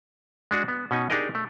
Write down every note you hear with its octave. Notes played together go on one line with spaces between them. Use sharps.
G#3 D4 F#4 G#4
B3
B2 C#4 D#4 G#5
D4 D#4 G4 G#4 A#4 D#5
A3